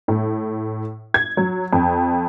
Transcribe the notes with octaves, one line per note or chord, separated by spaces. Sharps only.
A2
G#6
F#3
F2